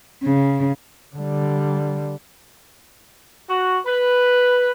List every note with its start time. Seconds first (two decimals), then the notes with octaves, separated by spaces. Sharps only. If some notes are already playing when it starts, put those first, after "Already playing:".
0.24 C#3
1.15 D3 G3
3.49 F#4
3.86 B4